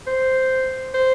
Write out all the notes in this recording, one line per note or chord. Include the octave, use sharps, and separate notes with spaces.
C5
C5